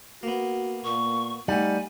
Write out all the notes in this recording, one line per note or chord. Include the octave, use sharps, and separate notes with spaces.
A#3 B3 F#4
A#2 C#6
G3 A3 D#4 F#5 G#5